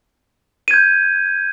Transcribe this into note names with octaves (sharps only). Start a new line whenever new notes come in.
G6 G#6 D#7